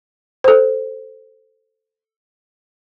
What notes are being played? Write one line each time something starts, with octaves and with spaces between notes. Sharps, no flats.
A4 C5